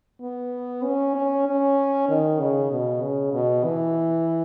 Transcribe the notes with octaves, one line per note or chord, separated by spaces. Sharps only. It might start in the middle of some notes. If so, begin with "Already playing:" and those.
B3
C#4
C#4
C#4
D#3
C#3
B2
C#3
B2
E3